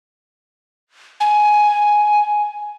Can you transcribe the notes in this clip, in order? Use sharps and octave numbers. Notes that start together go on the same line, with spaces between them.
G#5